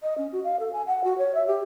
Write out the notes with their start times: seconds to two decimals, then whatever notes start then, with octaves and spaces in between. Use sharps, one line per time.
0.03 D#5
0.18 C#4
0.32 F#4
0.44 F5
0.60 A4
0.73 G#5
0.87 F#5
1.04 F#4
1.18 C#5
1.35 E5
1.47 G4